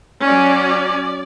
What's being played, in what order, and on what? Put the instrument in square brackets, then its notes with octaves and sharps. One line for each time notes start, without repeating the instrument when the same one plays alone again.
[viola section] F#3 C#4 D5